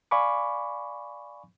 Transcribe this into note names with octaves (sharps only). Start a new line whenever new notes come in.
D5 F5 G#5 B5 C#6 D6